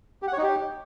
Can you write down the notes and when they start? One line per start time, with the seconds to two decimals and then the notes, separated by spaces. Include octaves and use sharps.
0.22 G4
0.28 F#5
0.33 C#5
0.38 D#4
0.43 G4